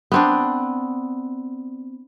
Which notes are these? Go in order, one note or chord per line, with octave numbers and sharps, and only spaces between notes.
B3 C4 D4